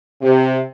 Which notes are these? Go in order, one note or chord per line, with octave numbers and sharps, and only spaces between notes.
C3